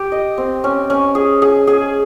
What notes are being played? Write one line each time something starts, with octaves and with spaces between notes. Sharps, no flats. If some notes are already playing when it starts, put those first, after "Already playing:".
Already playing: G4
D#5
C4
C#4
C#4
G#4
G#4
G#4